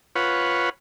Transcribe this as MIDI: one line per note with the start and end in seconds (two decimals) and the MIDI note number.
0.15 0.69 65
0.15 0.69 71
0.15 0.69 73
0.15 0.69 78